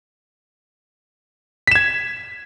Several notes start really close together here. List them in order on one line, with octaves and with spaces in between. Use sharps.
B6 E7 G#6